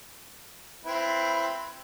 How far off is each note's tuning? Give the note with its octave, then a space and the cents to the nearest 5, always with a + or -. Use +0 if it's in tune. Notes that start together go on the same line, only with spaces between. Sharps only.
C4 +0 E4 +25 B4 +0